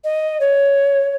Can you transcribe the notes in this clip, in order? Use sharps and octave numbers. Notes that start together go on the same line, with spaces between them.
D#5
C#5